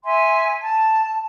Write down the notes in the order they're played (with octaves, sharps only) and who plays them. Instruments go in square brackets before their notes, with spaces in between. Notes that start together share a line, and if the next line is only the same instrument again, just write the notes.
[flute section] E5 G#5 C6
A5